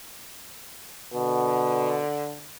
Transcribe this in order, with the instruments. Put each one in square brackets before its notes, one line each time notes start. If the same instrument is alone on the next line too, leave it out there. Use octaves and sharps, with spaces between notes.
[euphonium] B2 [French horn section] D3